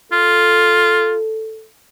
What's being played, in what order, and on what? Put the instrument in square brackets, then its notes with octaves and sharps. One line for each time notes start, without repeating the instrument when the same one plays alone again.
[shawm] F4 [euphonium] A4